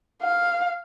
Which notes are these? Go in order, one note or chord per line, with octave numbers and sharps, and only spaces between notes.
F5